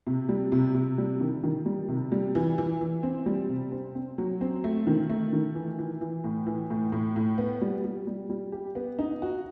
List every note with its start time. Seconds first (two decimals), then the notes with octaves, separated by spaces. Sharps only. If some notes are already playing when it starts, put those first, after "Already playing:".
0.07 C3
0.29 G3
0.52 C3
0.74 C3
0.98 G3
1.21 D#3
1.43 D#3
1.66 G3
1.89 C3
2.12 G3
2.35 E3
2.58 E3
2.81 E3
3.03 C4
3.26 G3
3.49 C3
3.72 C4
3.95 C4
4.18 F#3
4.41 C4
4.64 A3
4.87 D#3
5.10 A3
5.33 D#3
5.55 E3
5.78 E3
6.01 E3
6.24 A2
6.46 E3
6.70 A2
6.92 A2
7.16 A2
7.38 B3
7.61 G3
7.84 G3
8.07 G3
8.30 G3
8.52 G4
8.75 B3
8.99 D#4
9.22 F#4